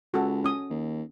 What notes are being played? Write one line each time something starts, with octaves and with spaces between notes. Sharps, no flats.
C#2 F#4 A4
C#4 D#6
D#2